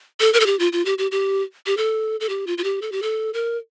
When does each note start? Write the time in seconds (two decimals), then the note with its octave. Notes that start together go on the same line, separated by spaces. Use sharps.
0.20 A4
0.34 A#4
0.40 A4
0.46 G4
0.59 F4
0.72 F4
0.85 G4
0.98 G4
1.11 G4
1.66 G4
1.77 A4
2.20 A4
2.29 G4
2.47 F4
2.58 F4
2.64 G4
2.82 A4
2.92 G4
3.02 A4
3.34 A#4